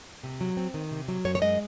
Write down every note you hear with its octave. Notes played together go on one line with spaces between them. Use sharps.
C3
F#3
C4
D#3
C3
F#3
F#2 C#5
C#5
G#3 D#5